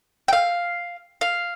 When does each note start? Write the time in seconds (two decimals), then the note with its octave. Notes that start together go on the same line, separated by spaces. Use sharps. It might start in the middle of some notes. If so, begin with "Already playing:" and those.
0.28 G5
0.33 F5
1.21 F5